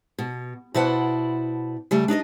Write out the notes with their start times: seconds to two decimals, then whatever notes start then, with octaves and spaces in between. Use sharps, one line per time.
0.18 B2
0.74 B2 E4 C5 D5 F#5 A5
1.91 C#3 G3 A3
2.08 D4 D#4 D5 D#5